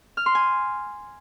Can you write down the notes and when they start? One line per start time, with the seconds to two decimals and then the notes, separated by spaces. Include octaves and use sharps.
0.17 F6
0.26 C6
0.35 G#5